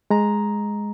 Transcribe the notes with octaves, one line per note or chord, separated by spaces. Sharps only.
G#3 A#5